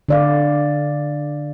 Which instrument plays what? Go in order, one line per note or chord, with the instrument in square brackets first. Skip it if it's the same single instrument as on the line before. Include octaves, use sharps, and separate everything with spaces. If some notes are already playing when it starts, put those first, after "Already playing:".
[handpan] D3 D5 F5